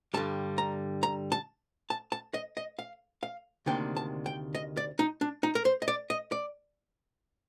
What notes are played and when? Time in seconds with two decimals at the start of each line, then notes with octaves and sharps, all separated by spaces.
0.14 G2 D3 G3 A5
0.58 A#5
1.03 A#5
1.32 A5
1.90 A5
2.12 A5
2.34 D#5
2.57 D#5
2.79 F5
3.23 F5
3.66 D2 C3 D#3 A#3 D4 G5
3.97 A5
4.26 G5
4.55 D#5
4.77 D5
4.99 D#4
5.21 D4
5.43 D#4
5.55 A#4
5.65 C5
5.82 D#5
5.88 D5
6.10 D#5
6.32 D5